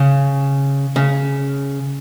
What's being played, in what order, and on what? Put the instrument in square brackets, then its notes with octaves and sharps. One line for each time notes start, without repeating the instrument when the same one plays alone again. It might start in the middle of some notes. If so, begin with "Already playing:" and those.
Already playing: [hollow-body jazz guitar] C#3
C#3